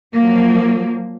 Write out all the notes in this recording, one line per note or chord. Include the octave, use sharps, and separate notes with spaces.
F3 F#3 A#3